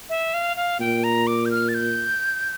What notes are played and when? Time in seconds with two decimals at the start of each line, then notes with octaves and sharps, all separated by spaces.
0.09 E5
0.34 F5
0.57 F5
0.80 A#2 G5
1.04 A#5
1.27 D6
1.45 G6
1.51 F6
1.68 A6
1.74 G6